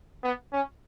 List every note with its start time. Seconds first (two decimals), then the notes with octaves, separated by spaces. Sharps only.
0.24 B3
0.52 C#4